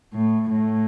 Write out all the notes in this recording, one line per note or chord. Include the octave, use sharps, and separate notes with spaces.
A2
A2